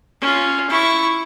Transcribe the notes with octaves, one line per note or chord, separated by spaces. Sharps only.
C#4 F4
E4 C#6